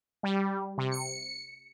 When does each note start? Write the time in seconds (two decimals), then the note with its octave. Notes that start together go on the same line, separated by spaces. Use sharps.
0.23 G3
0.78 C3
0.91 C#7